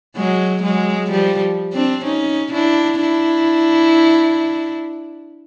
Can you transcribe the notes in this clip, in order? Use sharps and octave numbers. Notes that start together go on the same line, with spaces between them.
F#3 G#3
F#3 G#3
F3 G3
C4 D4
C#4 D#4
D4 E4
D4 E4